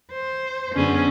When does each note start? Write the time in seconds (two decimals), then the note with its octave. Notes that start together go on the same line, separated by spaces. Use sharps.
0.11 C5
0.76 F#2 D3 B3 C#4 G#4